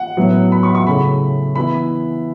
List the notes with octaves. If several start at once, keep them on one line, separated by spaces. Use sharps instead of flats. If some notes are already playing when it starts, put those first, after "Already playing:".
Already playing: F#5
A2 F#3 B3 E4
B5
C#6
C#6
C#3 A3 E4 B5
E3 B3 E4 B5